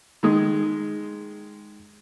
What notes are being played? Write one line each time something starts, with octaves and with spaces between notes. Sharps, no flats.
D#3 G#3 D#6